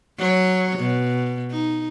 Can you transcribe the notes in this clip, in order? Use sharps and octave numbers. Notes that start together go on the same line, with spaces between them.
F#3 C#5
B2
D#4